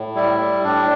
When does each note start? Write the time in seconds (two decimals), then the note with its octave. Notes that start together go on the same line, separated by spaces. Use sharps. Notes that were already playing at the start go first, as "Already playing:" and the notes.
Already playing: A2
0.15 G3 E4
0.40 G3
0.64 A2 D4